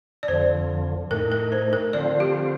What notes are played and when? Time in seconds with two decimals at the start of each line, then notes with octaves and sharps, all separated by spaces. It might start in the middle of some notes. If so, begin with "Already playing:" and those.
0.23 D5
0.28 F2 D3 F3 C5
1.11 A2 A3 D#4 A#4
1.32 A#4
1.52 C5
1.73 A#4
1.93 D3 F3 C4 F4 D5
2.20 G4